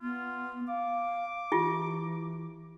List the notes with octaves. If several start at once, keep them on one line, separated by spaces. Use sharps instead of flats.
B3 F4
F5 D6
E3 E4 F4 G4